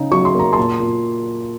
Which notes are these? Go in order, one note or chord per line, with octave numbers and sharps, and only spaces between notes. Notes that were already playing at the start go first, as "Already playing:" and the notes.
Already playing: C#3 D#4
F#3 C#6
C6
A#3
A#5
A#2 A5 C6
A#2